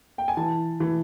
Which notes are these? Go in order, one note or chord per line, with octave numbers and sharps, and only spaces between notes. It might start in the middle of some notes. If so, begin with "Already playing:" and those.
G5
G#5
E3 A5
E3